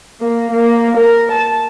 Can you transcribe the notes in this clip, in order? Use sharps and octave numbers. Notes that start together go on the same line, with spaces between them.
A#3
A#3
A#4
A5